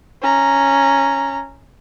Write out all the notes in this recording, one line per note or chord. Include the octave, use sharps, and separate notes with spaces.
C#4 A#5